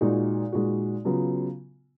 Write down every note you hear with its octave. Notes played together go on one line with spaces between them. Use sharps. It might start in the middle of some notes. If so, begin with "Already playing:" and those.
A#2 G#3 D#4 F#4
A#2 G#3 D#4 F#4
C#3 F#3 B3 F4